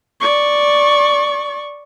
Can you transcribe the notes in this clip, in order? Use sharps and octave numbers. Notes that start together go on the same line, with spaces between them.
D5 C#6